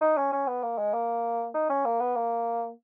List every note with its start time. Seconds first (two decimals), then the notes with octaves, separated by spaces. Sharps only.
0.01 D#4
0.17 C#4
0.32 C#4
0.47 B3
0.63 A#3
0.78 G#3
0.94 A#3
1.55 D#4
1.70 C#4
1.85 A#3
2.00 B3
2.15 A#3